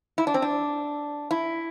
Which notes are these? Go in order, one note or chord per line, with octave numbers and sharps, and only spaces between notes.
E4
D4
C4
D4
E4